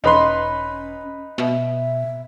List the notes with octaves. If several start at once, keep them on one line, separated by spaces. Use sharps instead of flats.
E1 C#4 D#4 B4 C6
B2 E5